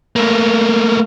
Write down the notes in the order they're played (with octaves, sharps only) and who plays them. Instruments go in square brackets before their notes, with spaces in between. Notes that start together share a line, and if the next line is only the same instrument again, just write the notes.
[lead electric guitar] A3 A#3